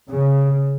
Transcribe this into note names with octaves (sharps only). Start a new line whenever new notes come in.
C#3